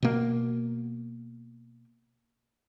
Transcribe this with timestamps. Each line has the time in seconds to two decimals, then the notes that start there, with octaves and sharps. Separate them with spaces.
0.03 B2 A#3